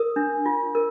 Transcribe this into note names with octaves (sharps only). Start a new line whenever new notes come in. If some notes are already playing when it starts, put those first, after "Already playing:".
Already playing: A#4 D#6
D4
F4
A#4